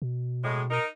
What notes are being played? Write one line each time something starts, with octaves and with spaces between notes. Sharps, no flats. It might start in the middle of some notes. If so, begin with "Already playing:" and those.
B2
A2 G#3
D#4 A#4